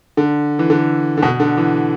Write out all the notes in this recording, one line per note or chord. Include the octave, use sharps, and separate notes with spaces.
D3
E3
D3
D3
B2
D3
E3